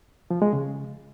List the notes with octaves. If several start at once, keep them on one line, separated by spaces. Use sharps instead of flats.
F3
G#3
C#3